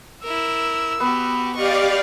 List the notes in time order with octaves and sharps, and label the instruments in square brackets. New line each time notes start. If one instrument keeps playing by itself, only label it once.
[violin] E4 A#4 [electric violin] E6
[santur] B3 [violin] F#4 G4
[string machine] G4 D5 F5 [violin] D#5 C#6